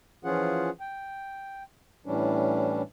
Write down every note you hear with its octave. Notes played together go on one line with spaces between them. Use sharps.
E3 F3 C#4 F4 G#4 F#5
G5
A2 E3 G3 C#4 D4